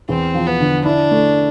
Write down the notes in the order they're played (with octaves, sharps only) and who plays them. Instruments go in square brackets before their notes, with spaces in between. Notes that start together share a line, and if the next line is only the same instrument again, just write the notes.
[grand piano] E2 [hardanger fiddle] C4
[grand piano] F3
[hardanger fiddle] B3
[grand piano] D3
[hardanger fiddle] D4 [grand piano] E4
[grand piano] A3